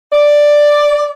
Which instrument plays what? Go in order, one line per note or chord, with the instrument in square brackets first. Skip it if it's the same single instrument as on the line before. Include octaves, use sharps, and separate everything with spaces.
[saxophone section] D5